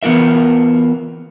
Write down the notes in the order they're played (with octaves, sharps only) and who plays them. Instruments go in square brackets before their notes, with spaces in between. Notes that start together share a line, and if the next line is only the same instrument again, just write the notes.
[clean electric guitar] E3 B3 F4 A#4 E5